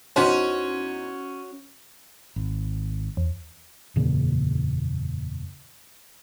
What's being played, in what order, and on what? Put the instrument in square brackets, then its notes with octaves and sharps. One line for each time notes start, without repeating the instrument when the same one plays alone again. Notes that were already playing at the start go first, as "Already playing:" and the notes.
[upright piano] E2 D#4 C5 [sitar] C#4 [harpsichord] F#4
[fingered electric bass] G#1
[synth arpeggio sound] E2
[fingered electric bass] F#1 E2 A#2 C#3